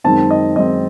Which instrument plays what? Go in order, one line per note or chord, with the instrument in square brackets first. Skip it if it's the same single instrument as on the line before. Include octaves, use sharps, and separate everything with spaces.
[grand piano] F#2 D#3 G#3 C4 A5
D#5
F#2 D#3 G#3 C4 D#5